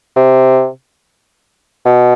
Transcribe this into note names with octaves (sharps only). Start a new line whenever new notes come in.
C3
B2